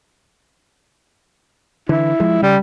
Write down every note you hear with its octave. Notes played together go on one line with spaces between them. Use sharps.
D3 E3 E4
F3 G#3
C#3 G3